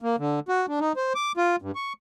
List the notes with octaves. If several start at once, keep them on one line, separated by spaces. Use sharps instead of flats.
A#3
D3
F#4
D4
D#4
C5
D6
F4
G2
C#6